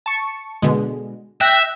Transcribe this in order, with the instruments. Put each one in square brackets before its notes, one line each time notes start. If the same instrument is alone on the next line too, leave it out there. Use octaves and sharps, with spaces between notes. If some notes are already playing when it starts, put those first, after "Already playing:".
[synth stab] A5 C#6 C#7
B2 D3 G#3
[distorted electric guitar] E5 [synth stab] G5 F#6 A#6